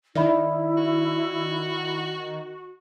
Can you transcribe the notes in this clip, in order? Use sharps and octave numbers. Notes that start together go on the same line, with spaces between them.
D#3 E4 D5 E5 B5
F#4